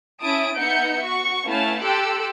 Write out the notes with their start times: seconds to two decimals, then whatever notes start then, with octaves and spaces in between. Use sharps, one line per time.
0.21 C#4 E4 E5 A5 D#6 D7
0.56 B3 D#4 E5 F#5 G6 C#7
1.01 F#4 C#6
1.46 A3 B3 C#4 E4 F5 A5
1.83 G4 A4 C6 E6 F#6 D7